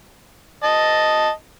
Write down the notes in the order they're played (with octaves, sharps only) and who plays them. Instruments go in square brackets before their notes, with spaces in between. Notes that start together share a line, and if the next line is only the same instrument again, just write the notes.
[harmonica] D#5 A5